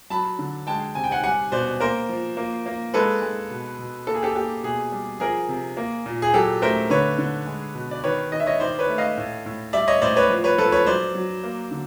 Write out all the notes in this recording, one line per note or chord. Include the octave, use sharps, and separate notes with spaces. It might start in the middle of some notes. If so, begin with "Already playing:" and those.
F#3 A5 B5
D3
G#3 G5 A5
C3 G#5
G5
F#5 G#5
G3 F#5 G#5
B2 C5 D5
A#3 A#4 C5
F3
A#3
A#3
G#3 A4 B4
G#3
B2
B2
A#3 A4
G#4
G4 A4
A#3 G4
B2 G#4
G3
F3 G#4 A#4
C3
A#3
A#2
G#4
F#3 G4 A4
A3 A#4 C5
D3 B4 C#5
D3
G#3
B2
D5
D#3 B4 C#5
D#3 D#5
E5
C#5 D#5
D#3 C5 D5
B4 C#5
A3
D#5 F5
A2
A2
G3 D5 E5
C#5 D#5
A2 C5 D5
B4 C#5
F3
B4 C#5
F3 A4 B4
B4 C#5
F#3 C5 D5
F#3
A#3
D3